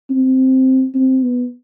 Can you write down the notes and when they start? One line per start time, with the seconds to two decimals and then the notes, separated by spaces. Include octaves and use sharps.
0.10 C4
0.94 C4
1.23 B3